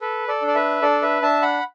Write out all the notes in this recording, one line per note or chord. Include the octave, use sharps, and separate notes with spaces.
A4 B4
A4 D5
D4
D5
B4 E5
D4 A4 D5
B4 E5
D4 E5 A5
F#5 B5